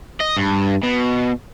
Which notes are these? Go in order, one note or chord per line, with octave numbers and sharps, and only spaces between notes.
D#5
G2
B2